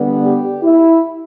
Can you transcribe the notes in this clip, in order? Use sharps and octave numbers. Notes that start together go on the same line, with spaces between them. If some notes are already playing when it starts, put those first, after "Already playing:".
Already playing: D3 G3 B3
G4
E4